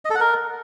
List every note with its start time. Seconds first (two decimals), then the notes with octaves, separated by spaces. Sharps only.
0.05 D#5
0.10 A4
0.15 F#5
0.20 A#4